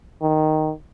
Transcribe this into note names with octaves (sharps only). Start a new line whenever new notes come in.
D#3